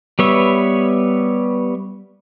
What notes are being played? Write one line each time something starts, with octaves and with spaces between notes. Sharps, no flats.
G3 B3 B4 C#5 E5